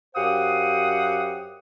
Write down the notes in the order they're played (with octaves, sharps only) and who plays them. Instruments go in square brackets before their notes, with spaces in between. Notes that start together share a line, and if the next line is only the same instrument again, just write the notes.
[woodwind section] F#2 G4 C5 F5 F#5 D#6